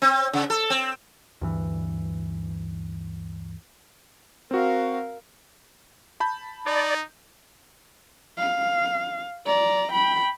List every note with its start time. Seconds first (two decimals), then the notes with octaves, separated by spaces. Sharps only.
0.02 C4
0.33 C#3
0.50 A4
0.70 C4
1.41 D2 G2 E3
4.51 C4 F#4 A#4 F5
6.20 A5 B5 G6
6.66 D#4 D5
8.38 F5
9.47 D5 A#5
9.92 G5 B5